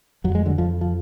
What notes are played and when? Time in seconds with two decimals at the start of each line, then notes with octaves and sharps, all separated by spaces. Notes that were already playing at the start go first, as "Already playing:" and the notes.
0.24 F2 F#3
0.35 G#3
0.46 D3 F#3
0.58 F2 F3
0.81 F3